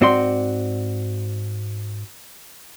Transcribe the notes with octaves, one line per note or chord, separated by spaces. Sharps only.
G#2 C4 F#4 D5 C6